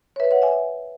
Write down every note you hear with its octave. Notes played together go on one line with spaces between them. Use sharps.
C#5
B4 E5
C#5 F#5
E5 G#5